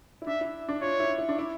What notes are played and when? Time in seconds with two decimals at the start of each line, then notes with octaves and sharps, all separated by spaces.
0.22 E4
0.27 D4 E5
0.41 E4
0.69 D4
0.82 F4 C#5
1.00 E4
1.18 E4
1.29 D4
1.39 E4